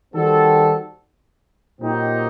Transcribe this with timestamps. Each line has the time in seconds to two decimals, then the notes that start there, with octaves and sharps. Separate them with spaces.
0.14 D#3 G3 C4 F#4 A4
1.80 A#2 F#3 C4 D#4 G4